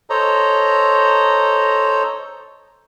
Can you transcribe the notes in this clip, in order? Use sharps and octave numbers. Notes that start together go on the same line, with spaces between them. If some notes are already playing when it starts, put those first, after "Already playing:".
A4 C5 C#5 D#5 A#5